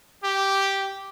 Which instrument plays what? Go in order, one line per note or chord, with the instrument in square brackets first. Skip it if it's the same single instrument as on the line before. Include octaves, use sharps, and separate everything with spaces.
[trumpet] G4